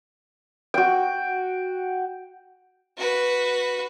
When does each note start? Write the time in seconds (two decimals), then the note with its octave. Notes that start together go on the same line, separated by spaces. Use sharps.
0.74 F#4 G5
2.97 F#4 B4